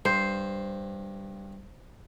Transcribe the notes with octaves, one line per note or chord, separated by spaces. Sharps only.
G2 C5